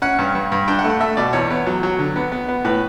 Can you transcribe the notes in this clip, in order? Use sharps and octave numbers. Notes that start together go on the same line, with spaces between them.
C#4 F#5
G2
G2
G2
D4 G5
F#5
A3
F#5
A3 E5
B2 D5
E2 C#5
B3
F#3
F#3
D3
B3
B3
B3
A2 B4